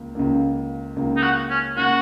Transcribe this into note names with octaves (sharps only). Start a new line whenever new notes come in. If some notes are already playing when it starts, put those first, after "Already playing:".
Already playing: C#2 A#3
C#2 C#3 A#3
C#2 C#3 A#3
D#4
F#4
C#4
C#3 A#3 F#4